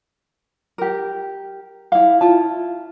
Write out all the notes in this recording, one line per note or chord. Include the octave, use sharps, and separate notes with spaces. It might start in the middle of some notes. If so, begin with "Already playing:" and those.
G4 A#4
E4 F5
E4 F4 A5